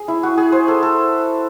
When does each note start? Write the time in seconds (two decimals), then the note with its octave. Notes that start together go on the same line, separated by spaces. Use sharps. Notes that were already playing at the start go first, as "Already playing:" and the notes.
Already playing: G#4
0.08 E4
0.23 F#4
0.38 G#4
0.52 C5
0.68 A4
0.83 A4